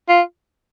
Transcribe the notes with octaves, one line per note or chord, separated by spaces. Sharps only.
F4